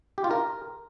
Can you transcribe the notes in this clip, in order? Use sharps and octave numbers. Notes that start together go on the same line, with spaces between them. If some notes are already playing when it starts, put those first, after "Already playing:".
G4
F4
A#4